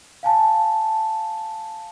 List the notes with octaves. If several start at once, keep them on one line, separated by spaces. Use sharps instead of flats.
F5 G#5 A5